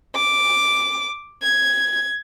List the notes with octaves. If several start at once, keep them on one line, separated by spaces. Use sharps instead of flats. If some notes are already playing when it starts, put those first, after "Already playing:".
D6
G#6